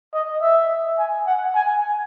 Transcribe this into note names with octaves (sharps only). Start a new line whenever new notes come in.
D#5
E5
G#5
F#5
G#5